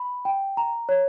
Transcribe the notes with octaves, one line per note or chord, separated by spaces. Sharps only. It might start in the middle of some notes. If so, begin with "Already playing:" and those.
Already playing: B5
G5
A#5
C#5